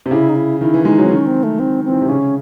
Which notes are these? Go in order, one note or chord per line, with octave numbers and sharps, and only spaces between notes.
C3
C#3 E4
D#4
E4
D#3 E4
E3
G#3 D#4
F#3
C4
D#3 C#4
C4
A3
D#3 C4
E3 C4
D#3
C3
C#3 C#4